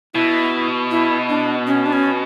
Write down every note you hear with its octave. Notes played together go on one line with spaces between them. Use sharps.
B2 E4
E4
D4
C#4
D4
C#4